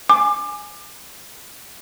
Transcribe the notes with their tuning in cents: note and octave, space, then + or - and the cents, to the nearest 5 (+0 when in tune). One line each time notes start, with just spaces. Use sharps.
G#5 +0 D6 +25